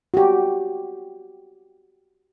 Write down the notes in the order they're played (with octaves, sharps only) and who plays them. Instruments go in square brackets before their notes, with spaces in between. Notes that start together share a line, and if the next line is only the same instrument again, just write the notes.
[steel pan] F#4 G4